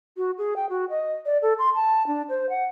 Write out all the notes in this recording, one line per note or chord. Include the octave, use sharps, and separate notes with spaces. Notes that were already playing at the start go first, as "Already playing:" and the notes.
F#4
G#4
G5
F#4
D#5
D5
A4
C6
A5
D4
C5
F#5